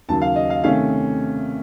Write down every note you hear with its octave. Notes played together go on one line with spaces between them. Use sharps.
D#2 C#3 F#3 A5
F5
D#5
F5
C3 D#3 A3 C#4 F5